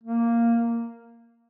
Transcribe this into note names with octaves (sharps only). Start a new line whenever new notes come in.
A#3